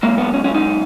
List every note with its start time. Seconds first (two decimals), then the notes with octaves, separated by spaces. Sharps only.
0.03 B1 A#2 G#3 A#3
0.18 B3
0.33 C#4
0.44 C#4
0.54 D#4